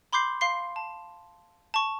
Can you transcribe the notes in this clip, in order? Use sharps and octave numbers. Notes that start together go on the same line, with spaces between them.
B5 C6 D6 G6 C7
F5 C6 C7
A5
A5 C#6